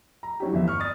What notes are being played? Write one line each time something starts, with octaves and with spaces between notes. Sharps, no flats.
A#5
F#3 C#4 D4 E4 F#4 G4
G1 E2 E5
C#6 F6
D5 D#6 A6